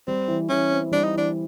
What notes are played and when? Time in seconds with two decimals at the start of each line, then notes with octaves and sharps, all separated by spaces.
0.07 G3 C4
0.28 E3
0.49 E3 C#4
0.71 C4
0.92 G3 D4
1.04 D#4
1.13 E3 D4